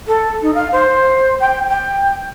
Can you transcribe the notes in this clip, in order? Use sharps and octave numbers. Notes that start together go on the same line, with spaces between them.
A4
D#4
F5
C5
G5
G5